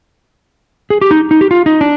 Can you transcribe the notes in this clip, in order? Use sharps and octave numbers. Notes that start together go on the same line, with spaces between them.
G#4
G4
D#4
D#4
G4
F4
D#4
D4